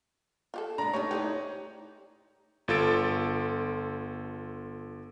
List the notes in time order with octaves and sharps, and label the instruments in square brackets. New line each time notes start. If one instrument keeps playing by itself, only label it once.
[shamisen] F4 G4 A4
[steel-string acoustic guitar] G#3 D4 [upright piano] A#5
[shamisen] G3 C#4 [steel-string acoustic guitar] A3 D#4 [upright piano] C#5
[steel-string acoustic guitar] D#4 E4 C5 [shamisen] G4 G#4 D5
[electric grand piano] G1 F4 A4 A6 D7